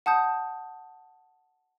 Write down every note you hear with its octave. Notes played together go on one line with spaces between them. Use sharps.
F#5 A5 D#6 G6